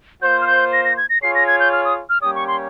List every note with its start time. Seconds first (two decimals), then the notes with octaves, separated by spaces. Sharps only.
0.22 A#3 F4 C5 G6
0.41 F6
0.47 G6
0.73 A#6
0.85 A#6
0.97 G#6
1.09 A#6
1.22 F4 G#4 C#5 C7
1.35 A#6
1.47 G#6
1.60 G6
1.72 F6
1.85 D#6
2.09 F6
2.22 G3 A#3 C#4 G4 C#5 D#6
2.36 C#6
2.47 C6